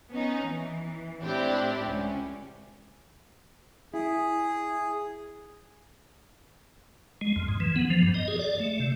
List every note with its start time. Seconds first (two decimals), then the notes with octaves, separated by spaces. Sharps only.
0.11 B3 C#4 D#4
0.44 E3
1.21 A2 C4 D4 E4 G4
1.84 C#2 C#4
3.94 E4 G#4
7.21 G#3
7.36 F2
7.48 G#2
7.60 E3
7.76 B3
7.90 F3
8.03 G2
8.14 D#5
8.28 G#4
8.39 D5
8.60 A3
8.80 C3